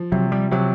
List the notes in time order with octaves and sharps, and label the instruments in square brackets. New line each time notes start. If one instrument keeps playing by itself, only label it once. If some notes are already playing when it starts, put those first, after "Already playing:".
Already playing: [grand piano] F3
[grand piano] C3 [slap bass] F#3
[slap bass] G3
[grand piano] C3 [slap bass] F#3